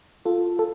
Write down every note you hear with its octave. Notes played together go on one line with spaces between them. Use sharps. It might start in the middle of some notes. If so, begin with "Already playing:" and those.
F4 A4
A4